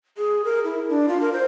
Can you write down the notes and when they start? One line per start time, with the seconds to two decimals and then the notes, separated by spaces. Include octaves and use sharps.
0.17 G#4
0.45 A#4
0.64 E4
0.89 D4
1.08 F4
1.21 A#4
1.33 C5